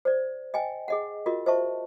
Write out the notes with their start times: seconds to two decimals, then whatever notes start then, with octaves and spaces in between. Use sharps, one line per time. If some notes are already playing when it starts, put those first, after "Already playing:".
0.05 C5 D5
0.54 D#5 G5 G#5
0.88 G#4 D#5 F#5
1.26 F4 F#4 A#4 D#5
1.46 C5 D#5 E5 A5 C#6